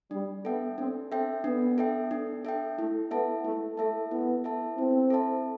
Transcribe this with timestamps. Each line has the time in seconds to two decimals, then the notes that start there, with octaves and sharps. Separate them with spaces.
0.11 G3 D4
0.45 B3 A4 E5 G5
0.78 C4 D4
1.12 C4 A4 E5 G5
1.44 B3 D4
1.78 A4 E5 G5
2.11 D4
2.45 A4 E5 G5
2.77 A3 E4
3.11 B3 A4 E5 A5
3.45 A3 E4
3.77 A3 A4 E5 A5
4.11 B3 E4
4.44 A4 E5 A5
4.77 C4 E4
5.10 A4 E5 A5